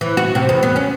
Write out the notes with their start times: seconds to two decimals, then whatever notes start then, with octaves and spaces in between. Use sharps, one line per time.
0.01 E3
0.17 F#4
0.35 C3
0.49 E2
0.63 B3
0.76 C#4